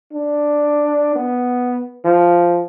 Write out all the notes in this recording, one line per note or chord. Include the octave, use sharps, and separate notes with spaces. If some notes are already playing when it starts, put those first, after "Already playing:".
D4
B3
F3